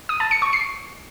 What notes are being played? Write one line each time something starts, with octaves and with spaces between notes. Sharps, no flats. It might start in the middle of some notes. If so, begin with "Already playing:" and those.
D#6
A5
C#7
C#6
C7